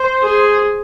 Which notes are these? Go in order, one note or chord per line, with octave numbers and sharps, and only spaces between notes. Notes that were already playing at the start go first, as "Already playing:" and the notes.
Already playing: C5
G#4